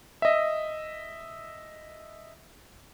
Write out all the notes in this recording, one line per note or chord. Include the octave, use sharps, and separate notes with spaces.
D#5 E5